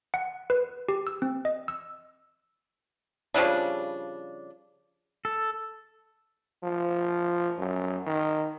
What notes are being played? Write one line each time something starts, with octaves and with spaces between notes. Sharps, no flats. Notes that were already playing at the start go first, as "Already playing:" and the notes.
F#5
B4
G4
E6
C4
D#5
E6
C#3 F3 G3 D4
A4
F3
F#2
D#3